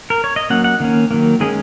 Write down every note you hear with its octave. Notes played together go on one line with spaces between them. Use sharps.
A#4
C#5
D#5
F#3 A#3 C#4 F#5
F#5
D#3 A#3 C#4
D#3 F#3 A#3
D#3 G#3 C#4 G#4